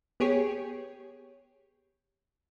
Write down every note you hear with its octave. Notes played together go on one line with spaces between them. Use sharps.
B3 G4 G#4 C#5